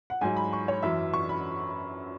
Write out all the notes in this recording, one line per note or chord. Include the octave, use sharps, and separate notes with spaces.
F#5
G#2 F#3 G#5
B5
C#6
C#5
F#2 E3 E5
C#6
B5